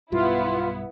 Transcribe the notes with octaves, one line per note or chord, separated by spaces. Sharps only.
B1 G2 G3 B3 E4 F4